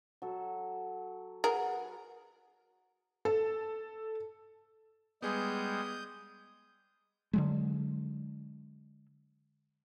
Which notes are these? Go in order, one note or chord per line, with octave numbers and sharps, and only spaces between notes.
F#3 A4
G#4 A#4 B4 F#5
A4
G3 G#3 B3 G#4 D#6 G6
D3 F#3 G#3